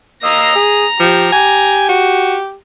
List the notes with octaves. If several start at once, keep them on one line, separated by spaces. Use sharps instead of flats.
A#3 D#5 A#5 E6
G#4
F3 G4
G4 G#5
F#4